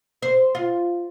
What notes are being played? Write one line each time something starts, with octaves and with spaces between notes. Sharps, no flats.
C5
F4